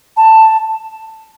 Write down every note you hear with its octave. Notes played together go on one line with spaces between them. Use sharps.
A5